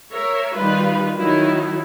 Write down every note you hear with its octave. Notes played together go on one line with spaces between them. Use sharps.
A#4 C#5 E5
D#3 G3 F4 B4
D#3 F#3 E4